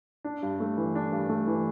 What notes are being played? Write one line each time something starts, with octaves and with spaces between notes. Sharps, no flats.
D4
G2
A3
E3
D4
G2
A3
E3